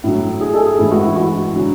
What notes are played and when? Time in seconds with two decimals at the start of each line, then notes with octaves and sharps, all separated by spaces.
0.04 A2 F#3
0.41 G#4
0.54 A4
0.66 G#4
0.78 A2 E3 G#3 E4
0.91 F#4
1.03 E4
1.16 F#4
1.56 D3 F#3